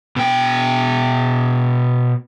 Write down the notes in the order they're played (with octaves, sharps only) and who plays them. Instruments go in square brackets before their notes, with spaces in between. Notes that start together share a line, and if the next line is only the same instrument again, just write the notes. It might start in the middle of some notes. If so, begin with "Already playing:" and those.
[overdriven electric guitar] B2 G5